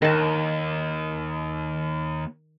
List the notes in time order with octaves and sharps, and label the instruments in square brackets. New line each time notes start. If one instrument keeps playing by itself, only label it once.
[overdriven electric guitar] D#2 [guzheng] D#3 A5